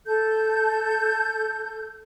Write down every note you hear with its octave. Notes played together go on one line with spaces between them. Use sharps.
A4 G6